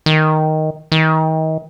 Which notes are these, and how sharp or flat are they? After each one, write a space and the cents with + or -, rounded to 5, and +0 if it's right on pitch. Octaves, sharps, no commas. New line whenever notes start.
D#3 +5
D#3 +35